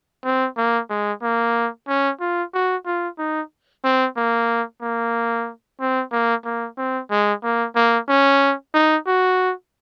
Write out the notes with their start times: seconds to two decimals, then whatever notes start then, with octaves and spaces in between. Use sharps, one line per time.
0.25 C4
0.57 A#3
0.90 G#3
1.23 A#3
1.88 C#4
2.20 F4
2.54 F#4
2.86 F4
3.18 D#4
3.84 C4
4.17 A#3
4.82 A#3
5.80 C4
6.12 A#3
6.45 A#3
6.78 C4
7.11 G#3
7.43 A#3
7.76 A#3
8.08 C#4
8.74 D#4
9.07 F#4